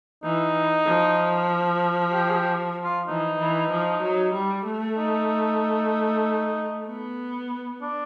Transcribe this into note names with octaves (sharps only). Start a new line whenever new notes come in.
E3 D#4
F3
G4
G#4
G4
F4
E3 D#4
E3
F3
F#3
G3
A3
D#4
B3
D4